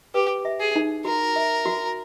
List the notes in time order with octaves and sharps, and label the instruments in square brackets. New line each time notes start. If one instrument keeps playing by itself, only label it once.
[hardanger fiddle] G4 [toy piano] B4
[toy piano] E5
[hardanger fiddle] G#4
[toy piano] D#4
[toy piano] F#4 [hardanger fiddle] A#4
[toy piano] E5
F#4